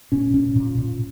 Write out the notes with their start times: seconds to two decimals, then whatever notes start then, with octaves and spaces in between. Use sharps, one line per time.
0.12 A#2 C#4
0.34 A#2 C#4
0.56 A#2
0.78 A#2